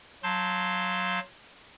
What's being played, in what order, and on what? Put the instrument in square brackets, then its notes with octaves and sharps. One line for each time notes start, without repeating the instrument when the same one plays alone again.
[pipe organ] F#3 F5 A5 C6 G6